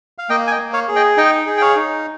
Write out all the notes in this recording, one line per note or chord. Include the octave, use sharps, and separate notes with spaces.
F5
A#3 D#5 G5
G#5
D#5 G5
A#3
C#5 F5
G#4
D#5 G5
D#4 D#5 G5
G#4
G5
C#5 F5
D#4